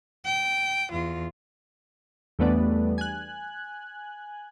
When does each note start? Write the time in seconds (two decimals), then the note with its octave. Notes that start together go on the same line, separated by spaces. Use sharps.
0.25 G5
0.91 E2 F4
2.39 E2 G3 A3 B3 D4
2.98 G#5 F#6